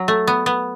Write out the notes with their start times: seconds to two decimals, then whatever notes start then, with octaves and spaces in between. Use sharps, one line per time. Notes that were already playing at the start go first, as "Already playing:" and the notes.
Already playing: F#3
0.08 A3
0.27 B3
0.46 B3